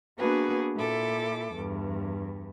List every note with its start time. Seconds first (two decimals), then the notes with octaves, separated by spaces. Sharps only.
0.18 A#3 B3 D4 F#4 G#4 B4
0.76 A#2 E4 A4 D6
1.54 E2 G2